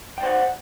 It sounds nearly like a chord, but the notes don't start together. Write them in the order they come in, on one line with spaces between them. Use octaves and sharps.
G5 D5 C5 F#5